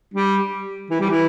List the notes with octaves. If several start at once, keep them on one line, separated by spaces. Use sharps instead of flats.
G3
E3
G3
E3